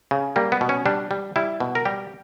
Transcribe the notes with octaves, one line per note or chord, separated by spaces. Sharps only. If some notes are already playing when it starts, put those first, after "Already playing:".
C#3
G3 A#3
B3
B2
C#4
G3 D4
G3
G3 E4
B2
A#4
G3 G4